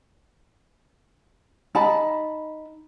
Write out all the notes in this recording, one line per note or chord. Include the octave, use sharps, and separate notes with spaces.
D#4 A5 B5